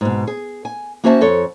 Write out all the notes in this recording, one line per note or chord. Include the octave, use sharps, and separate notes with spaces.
G#2 B2
G#4
G#5
A#3 C#4 F#4 C5 E5 A5
F2 A4 C#5